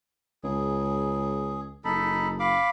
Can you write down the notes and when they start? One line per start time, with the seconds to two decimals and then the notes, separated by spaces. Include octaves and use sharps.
0.44 C#2 G#4
1.84 F#1 D#4 A4 B5
2.40 F5 B5 D6